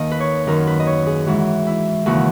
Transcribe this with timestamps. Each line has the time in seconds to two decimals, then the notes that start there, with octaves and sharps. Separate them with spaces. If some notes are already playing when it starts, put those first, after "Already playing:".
Already playing: D#2 D#3 D#5
0.11 B4
0.20 C#5
0.47 F#2 D#3 A#4
0.67 B4
0.80 D#5
0.87 C#5
1.07 G#4
1.27 G#2 E3 F#4
1.67 E4
2.06 D#2 C#3 E3 F#4